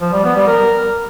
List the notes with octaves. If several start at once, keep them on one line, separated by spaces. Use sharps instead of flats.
F3
G3
B3
G3
A#4